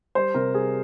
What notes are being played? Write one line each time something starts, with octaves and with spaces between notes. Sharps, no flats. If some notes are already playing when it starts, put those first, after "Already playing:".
G3 C5
C3 A#4
G3 G#4